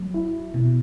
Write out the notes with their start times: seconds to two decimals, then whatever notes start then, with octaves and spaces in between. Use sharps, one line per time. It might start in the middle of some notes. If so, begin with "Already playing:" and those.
Already playing: F#3
0.14 E4
0.54 B2